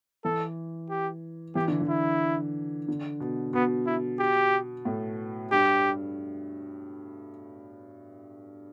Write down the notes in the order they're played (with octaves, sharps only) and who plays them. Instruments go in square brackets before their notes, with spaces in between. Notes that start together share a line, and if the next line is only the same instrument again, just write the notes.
[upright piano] E3 [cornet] A4
[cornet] G4
[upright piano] E3 [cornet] G4
[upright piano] D3
E3
[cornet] E4
[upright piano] D3
B2
[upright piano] B2 [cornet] B3
[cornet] E4
G4
[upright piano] A2
[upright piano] G2 [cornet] G4